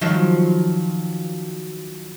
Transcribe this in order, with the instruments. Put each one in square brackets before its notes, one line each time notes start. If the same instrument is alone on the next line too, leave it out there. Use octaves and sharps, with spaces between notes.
[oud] D#3 F3 F#3